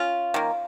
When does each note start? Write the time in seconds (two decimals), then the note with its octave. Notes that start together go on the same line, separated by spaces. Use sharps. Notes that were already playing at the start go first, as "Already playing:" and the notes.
Already playing: C#4 F4
0.34 D#3 A#3